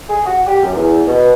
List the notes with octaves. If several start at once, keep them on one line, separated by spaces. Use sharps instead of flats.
G#4
F#4
G4
F#2
E2
B2